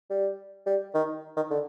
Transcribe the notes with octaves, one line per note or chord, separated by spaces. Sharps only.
G3
G3
D#3
D#3
D3